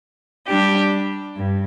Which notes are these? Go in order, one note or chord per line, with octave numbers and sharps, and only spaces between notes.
G3 D4 G4
G2